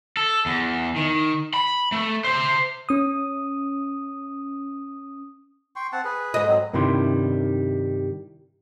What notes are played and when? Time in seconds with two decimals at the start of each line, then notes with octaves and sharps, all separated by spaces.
0.17 A4
0.46 E2
0.96 D#3
1.54 B5
1.92 A3
2.24 C5 E5
2.89 C#4 D#6
5.76 G5 C6 C#6
5.92 C4 F#5 A5
6.05 G#4 B4
6.34 G#2 D#5
6.47 F#3 C4
6.73 G2 C3 D#3 G3 E4 C6